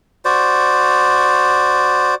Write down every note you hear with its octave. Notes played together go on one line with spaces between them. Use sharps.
F#4 C5 D5